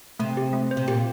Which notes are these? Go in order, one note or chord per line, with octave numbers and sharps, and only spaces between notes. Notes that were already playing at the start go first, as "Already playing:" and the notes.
C3 A3
G4
A3
C5
C3
A#2 G4